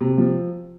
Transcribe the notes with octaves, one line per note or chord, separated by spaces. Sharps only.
C3
F3